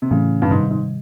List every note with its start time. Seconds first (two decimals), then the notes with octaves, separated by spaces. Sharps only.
0.02 C3
0.11 A2 C#3 E3 A3
0.42 G2
0.51 G#2 C3 D#3 G3
0.71 G#2